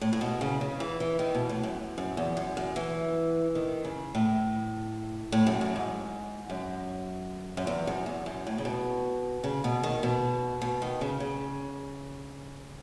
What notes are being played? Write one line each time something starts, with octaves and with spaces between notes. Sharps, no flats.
A2
A2
B2
C#3
C#3
E3
E3
D#3
B2
A2
F#2
F#2
E2
F#2
F#2
E3
D#3
C#3
A2
A2
F#2
F#2
G#2
F#2
F#2
E2
F#2
E2
F#2
A2
C#3
B2
C#3
B2
D#3
B2
B2
D#3
C#3
C#3